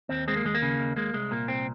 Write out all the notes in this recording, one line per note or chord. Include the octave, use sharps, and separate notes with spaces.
D#2 C4
G#3 C4
A#3
D#2 G#3
A#3
C#3
D#2
G#3 A#3
C2 G#3
A#2 A#3
C2 C4